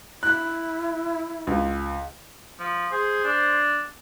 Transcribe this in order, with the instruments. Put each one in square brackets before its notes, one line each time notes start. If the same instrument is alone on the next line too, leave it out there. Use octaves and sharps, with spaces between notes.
[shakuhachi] E4 [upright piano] F#6
[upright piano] C#2
[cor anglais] F3
[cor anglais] G#4 [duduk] C5
[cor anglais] D4